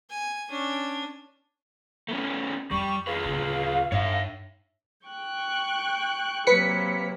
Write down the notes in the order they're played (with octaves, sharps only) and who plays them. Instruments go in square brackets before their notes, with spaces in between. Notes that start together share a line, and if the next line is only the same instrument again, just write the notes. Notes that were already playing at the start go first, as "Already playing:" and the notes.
[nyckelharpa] G#5
C#4 D4
[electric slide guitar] A3 B3 C#4
[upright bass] F2 [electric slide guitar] G3 [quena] C#6
[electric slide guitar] F4 G#4 B4 [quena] F5
[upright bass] D1 C#3
[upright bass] G2 D#4 [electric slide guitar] C#5 E5
[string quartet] G5 C#6 F#6
[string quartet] C3 F#3 A#3 [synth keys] B4 B6 C#7